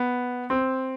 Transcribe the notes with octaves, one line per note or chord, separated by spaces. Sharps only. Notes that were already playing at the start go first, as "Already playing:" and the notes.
Already playing: B3
C4